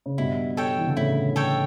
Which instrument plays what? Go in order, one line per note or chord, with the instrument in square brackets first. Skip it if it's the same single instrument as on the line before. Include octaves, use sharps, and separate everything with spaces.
[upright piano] C#3
[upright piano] G2 B2 [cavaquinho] E4
[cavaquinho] A4 C#5 G5
[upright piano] E3
D3
[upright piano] A2 C#3 [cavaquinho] E4
[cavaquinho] A4 C#5 G5